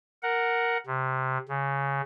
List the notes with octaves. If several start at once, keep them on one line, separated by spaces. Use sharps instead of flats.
A#4 F#5
C3
C#3